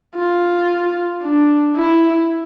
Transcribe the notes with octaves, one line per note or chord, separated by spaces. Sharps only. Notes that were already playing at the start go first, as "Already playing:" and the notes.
F4
D4
E4